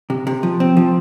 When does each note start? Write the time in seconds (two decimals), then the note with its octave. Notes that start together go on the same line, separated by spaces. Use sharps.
0.10 C3
0.27 C3
0.43 F3
0.60 C4
0.77 F3